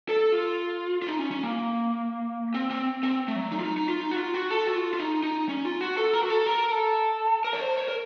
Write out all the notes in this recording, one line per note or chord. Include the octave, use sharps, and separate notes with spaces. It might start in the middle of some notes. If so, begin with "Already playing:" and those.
A4
F4
F4
D#4
C#4
C#4
A#3
C4
C4
C4
A3
F#3
D#4
F4
D#4
D#4
F4
D#4
F#4
F4
F#4
A4
F#4
F4
F4
D#4
D#4
C#4
F4
F#4
A4
A#4
F#4
A4
A#4
A4
A#4
C#5
C5
C#5
A#4